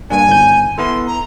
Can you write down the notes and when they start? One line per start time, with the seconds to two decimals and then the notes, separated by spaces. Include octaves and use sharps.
0.10 G2 A#3 D4 G#5
0.28 G1 G6
0.78 B3 E4 A4 C6
1.07 A#5